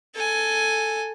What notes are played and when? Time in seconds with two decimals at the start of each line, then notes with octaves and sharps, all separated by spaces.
0.15 A4 G#5